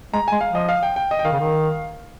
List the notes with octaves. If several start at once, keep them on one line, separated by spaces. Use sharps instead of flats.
G#3 A#5
G#3 G#5
F5
F3 D#5
F5
G5
G5
D#5
G5
D#3 F5
C#3
D#3